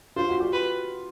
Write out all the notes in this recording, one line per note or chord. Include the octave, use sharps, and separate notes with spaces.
F4 C5
F#4
G4
B4